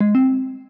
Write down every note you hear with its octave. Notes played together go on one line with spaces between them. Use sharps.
G#3
C4